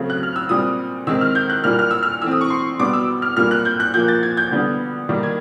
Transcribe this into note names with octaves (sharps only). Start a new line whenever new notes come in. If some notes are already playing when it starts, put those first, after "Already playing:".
Already playing: C#3 F#3 A3 C4
F#6
F6
E6
A#2 G3 C4 D#6
D#3 G#3 C4 E6
F6
G6
F#6
A#2 G3 A#3 F6
F6
E6
F6
E3 A3 C4 E6
D#6
C#6
C6
B2 G3 B3 D6
E6
F6
A#2 G3 A#3 F6
F#6
G6
F#6
A#2 F3 A#3 G6
A6
G#6
G6
D3 G3 B3
D#3 G3 A#3
G#6